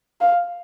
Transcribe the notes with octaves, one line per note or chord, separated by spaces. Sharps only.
F5